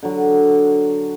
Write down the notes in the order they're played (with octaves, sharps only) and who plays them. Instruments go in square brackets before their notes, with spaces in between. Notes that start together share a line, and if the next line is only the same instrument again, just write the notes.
[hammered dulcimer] D3 F#3